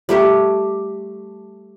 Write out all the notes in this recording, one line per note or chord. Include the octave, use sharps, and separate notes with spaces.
G3 A3 G4